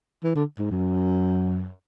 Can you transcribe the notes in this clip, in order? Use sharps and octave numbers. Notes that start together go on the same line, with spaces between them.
E3
D3
G#2
F#2